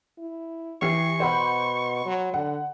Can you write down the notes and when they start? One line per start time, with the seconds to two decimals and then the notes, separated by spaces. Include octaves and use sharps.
0.18 E4
0.82 E3 E4 G4 C#6 C7
1.20 B2 C5 F#5 B5
2.06 F#3
2.34 D3 F#5